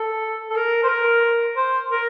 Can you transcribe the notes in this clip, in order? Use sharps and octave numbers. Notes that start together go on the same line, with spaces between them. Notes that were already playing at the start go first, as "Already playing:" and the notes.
Already playing: A4
A4
A#4
C5
A#4
C5
A#4